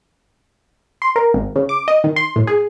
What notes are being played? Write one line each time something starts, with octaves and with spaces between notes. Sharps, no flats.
C6
A#4
G#1
C#3
D6
D#5
D#3
C6
A2
G#4